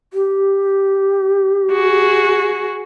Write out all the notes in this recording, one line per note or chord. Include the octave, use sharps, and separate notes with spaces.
G4
F#4 G#4